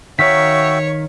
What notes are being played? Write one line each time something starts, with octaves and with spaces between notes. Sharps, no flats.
D#3 F#4 C#5 E5 F5 G5 A#5 B6